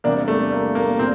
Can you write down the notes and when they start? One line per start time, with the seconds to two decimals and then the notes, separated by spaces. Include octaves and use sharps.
0.04 E2 C3 G3 A#3 D4
0.28 A3
0.52 A#3
0.75 A#3
0.99 A#2 C4